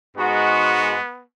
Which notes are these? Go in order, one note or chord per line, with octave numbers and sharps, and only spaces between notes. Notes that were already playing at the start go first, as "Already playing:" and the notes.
G#2 G#3 B3 F#4